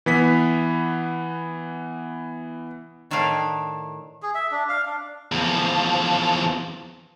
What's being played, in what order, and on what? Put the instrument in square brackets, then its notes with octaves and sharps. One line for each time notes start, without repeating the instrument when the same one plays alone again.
[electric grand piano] E3 B3 B6
[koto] A2 D#3 D4 E4 F5
[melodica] G#4
E5
D4
F5
D4
[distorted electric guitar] E2 F3